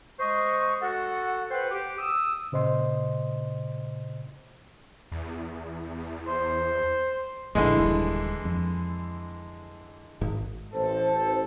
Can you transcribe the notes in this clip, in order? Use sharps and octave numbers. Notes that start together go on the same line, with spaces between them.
G#3 C5 D#5 C#6
F#4 A4 F#5
B4 C5 F#5 G5
G4
D#6 E6
A#2 C#3 C5 D#5 C6
E2
C5
A#1 A2 D3 E3 G#3
D#1 G2
F2
G#1
A1 A4 C5